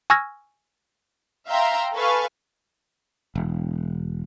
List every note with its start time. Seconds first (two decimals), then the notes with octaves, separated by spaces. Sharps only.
0.10 G#5 C#6 E6 F6 G#6 A#6
1.48 E5 F5 G5 A#5 C6
1.95 A4 B4 F5 G#5 C#6
3.35 E1